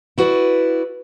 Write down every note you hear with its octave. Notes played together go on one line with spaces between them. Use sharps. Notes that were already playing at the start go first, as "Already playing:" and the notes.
E4 F#4 B4 C#5 D5